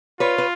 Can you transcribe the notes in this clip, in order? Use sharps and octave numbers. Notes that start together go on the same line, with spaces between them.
F4 B4 C#5
B4